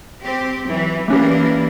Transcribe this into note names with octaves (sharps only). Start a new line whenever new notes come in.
C4 G4
E3 F#3
E3 A3 A#3 C#4 D4 G4